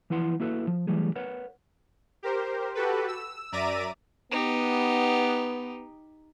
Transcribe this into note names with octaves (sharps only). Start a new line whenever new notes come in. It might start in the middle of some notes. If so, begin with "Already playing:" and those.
E3 F3 E4 B4 F#5 C6
A#3 E4 F#4 A4 B4
F3
E3 F#3 G3 A3 G#4
A#4 B4 C#5 F#5
G4 A#4 C5
F#4 G4 A4 B4
E6
F#2 D5 E5 A#5 D6 D#7
B3 D#4 G4